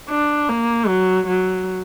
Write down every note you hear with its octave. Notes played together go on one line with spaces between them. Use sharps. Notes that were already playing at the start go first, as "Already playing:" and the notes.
D4
A#3
F#3
F#3